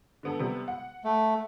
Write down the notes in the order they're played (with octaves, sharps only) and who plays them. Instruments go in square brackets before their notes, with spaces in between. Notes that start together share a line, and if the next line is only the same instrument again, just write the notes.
[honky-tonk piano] D3 B3 A4
C3 G3 B3
F#5
[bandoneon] A3